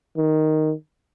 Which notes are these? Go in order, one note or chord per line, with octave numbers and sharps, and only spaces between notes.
D#3